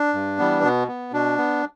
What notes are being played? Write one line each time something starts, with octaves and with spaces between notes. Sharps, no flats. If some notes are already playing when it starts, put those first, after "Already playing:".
Already playing: D4
G2
E3 G3 B3
B2 B3
B3
B2 D4
B3